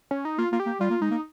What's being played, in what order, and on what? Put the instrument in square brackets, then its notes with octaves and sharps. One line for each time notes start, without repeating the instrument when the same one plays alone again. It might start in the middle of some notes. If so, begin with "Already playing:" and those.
[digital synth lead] C#4
D#4
[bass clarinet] A#3 [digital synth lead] F4
[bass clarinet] A#3 [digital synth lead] F4
[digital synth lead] G4
[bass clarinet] A#3
[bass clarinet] G3 [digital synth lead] F4
[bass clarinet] A#3
[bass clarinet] G#3 [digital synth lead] D#4
[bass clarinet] A#3